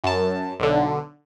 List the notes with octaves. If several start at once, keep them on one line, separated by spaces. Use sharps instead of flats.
F#2 A5
B1 D3